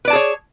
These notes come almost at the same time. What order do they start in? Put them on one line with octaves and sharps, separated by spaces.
B4 D5 A5 G#4 C#5